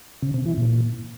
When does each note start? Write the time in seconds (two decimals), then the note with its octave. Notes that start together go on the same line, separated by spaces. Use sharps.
0.22 C#3
0.34 C3
0.46 E3
0.57 A#2